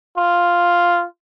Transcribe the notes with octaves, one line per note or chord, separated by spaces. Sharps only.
F4